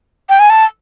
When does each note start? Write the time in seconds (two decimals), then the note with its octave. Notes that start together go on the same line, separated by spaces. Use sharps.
0.29 G5
0.40 G#5
0.50 A5